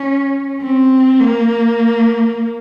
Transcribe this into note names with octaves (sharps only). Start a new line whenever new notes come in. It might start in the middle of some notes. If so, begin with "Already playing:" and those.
Already playing: C#4
C4
A#3